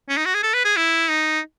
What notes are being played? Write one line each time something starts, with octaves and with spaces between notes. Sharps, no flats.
C#4
D#4
F#4
G#4
A4
B4
G#4
E4
D#4